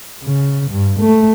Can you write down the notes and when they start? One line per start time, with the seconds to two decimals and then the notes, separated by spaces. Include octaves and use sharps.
0.23 C#3
0.71 G2
1.00 A3